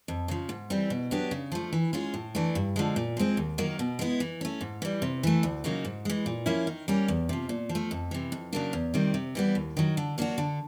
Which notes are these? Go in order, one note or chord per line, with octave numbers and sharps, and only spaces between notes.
F2
C#3 F3
G#2
E3 G3 C4
B2
F#3 B3 D4 G4
C#3
F3 A3
E3
G#3 C#4 F4 G#4
A2
E3 A3 D4
G2
D3 F3 G#3
A#2
F3 G#3 C4
D#2
D#3 F#3 A#3
B2
G#3 B3 E4
E3
A3 C#4
G#2
E3 G3
C3
E3 A3
D2
C#3 F#3 A#3 D#4
G#2
E3 G#3
A#2
F3 A#3 C#4 E4
D#3
G3 A#3 C#4
E2
C3 F3
A#2
F3
A3
F2
C3 E3
F2
C#3 F#3 A#3 D4
E2
C3 D#3 G3 C4
C3
E3 G3 B3
D#2
D#3 F#3
D3
F#3 A#3 D4 F#4
D3